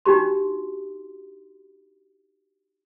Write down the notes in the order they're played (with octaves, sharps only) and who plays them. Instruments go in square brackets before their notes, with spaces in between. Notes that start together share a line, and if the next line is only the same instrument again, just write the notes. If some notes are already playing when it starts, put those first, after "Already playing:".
[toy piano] D4 D#4 F#4 G4 C6